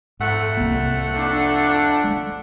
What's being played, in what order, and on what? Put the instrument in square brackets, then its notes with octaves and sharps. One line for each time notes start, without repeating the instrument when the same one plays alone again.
[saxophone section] F2 A3 F#5 [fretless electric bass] G#2
[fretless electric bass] C2 A#3
[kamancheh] D4
[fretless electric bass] G#3